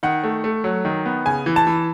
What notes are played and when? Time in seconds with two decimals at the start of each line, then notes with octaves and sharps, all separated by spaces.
0.03 D#3 F#5
0.24 A3
0.44 A3
0.64 F#3
0.85 D#3
1.06 B3
1.26 C#3 G#5
1.46 E3
1.56 A5
1.67 E3